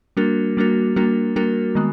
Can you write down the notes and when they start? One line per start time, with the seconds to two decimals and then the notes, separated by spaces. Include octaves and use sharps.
0.17 G3 A#3 D4 F#4 A#4
0.57 G3 A#3 D4 F#4 A#4
0.96 G3 A#3 D4 F#4 A#4
1.36 G3 A#3 D4 F#4 A#4
1.75 D#3 G#3 B3